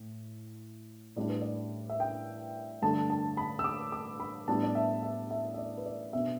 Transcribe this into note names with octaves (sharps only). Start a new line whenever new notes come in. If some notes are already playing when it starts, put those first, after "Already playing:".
Already playing: A2
A2 G3 D4 D5
B4
D5
E5
G5
G2 D3 A3 D4 A5
A5
B5
E6
D6
D6
B5
A2 G3 B3 D4 A5
D5
E5
E5
E5
E5
D5
B4
D5
B2 B3 D4 E5